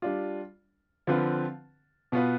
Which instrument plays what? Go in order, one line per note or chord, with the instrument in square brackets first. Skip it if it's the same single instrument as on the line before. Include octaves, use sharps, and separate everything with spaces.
[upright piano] G3 D4 F4
D3 F3 C4 F4 B4
B2 B3 F4 B4